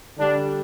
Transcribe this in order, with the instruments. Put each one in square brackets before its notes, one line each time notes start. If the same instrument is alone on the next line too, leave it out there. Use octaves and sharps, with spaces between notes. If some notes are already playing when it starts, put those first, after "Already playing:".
[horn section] D3 G3 D4